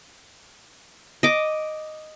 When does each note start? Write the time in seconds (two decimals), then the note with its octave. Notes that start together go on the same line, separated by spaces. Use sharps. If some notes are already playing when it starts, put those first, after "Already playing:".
1.23 D#5 D6